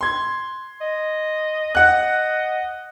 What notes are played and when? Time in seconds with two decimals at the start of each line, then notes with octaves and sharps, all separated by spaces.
0.01 C6 G#6
0.81 D#5
1.75 D#5 F#5 F#6